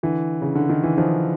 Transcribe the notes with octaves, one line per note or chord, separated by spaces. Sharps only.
D3 E3
C#3
D3
D#3
E3
D#3 F3